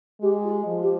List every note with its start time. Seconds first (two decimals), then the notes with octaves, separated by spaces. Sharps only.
0.21 G#3 G4
0.44 F4
0.66 F3
0.82 G4